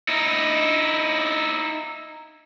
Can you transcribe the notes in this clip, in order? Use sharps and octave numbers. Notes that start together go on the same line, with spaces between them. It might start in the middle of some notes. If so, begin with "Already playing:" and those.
D#4 E4